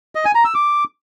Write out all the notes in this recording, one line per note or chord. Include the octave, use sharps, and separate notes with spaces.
D#5
G#5
A#5
E6
D6